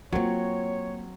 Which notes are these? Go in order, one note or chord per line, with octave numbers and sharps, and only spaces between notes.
F#3 A#3 C4 F4 C#5